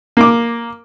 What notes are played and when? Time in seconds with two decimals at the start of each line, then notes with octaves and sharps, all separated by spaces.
0.17 A#3 D6